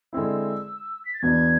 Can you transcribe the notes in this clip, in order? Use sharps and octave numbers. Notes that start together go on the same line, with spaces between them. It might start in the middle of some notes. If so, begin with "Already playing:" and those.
D3 G#3 C4 E4 E6
B6
A6
E2 B2 B3 D4 G#6